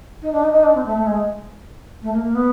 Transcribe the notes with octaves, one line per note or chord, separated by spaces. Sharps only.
D#4
D4
D#4
D#4
D4
C4
A3
A3
G#3
A3
A#3
A#3
B3